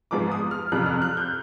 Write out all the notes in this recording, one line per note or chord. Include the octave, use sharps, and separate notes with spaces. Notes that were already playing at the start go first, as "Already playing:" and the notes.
G#2 F3 G#3 B3 D6
D#6
F6
F2 C3 F3 F#6
F6
F#6
G6